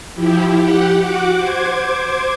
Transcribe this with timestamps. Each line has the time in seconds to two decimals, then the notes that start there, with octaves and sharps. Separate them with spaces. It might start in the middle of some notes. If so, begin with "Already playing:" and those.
0.15 F3 E4 G4
0.56 G4 F#5
1.00 F#4 F#5 D6
1.36 C5 D6 G#6